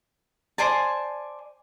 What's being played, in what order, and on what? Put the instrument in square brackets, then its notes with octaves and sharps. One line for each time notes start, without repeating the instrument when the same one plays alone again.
[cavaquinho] C5 D5 G#5 A5